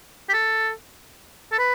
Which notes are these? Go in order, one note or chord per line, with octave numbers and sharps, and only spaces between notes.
G4
A4
A4
B4